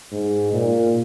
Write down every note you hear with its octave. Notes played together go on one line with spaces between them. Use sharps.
G#2
A#2